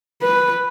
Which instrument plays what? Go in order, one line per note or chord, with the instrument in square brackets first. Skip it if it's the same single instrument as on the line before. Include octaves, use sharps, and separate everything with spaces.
[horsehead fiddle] B4